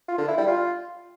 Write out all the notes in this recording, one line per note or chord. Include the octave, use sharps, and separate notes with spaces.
F4
D3
E4
G3
F4